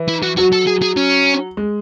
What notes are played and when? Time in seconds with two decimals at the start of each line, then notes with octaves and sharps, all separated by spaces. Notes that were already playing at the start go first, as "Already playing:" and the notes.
Already playing: E3
0.09 E4
0.23 F#4
0.37 F#3 F#4
0.53 A4
0.67 G#4
0.82 G#4
0.97 C#4
1.57 G#3